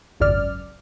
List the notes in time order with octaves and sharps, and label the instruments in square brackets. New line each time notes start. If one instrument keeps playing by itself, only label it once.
[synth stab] G#1 C#2 F#2 D5 F6